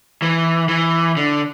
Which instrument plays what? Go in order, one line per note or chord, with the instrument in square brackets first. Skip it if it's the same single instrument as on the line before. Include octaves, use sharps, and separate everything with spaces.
[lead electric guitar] E3
E3
D3